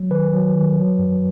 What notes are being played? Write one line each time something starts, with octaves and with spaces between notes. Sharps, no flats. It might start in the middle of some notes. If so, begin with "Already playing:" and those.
Already playing: F#3
D#3 B4
F#3
D#3
F#3
F#2